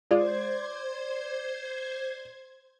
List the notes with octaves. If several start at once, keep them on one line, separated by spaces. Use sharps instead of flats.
G#3 F4 C5 D5 G#6